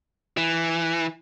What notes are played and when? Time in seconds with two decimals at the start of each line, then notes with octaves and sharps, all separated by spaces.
0.37 E3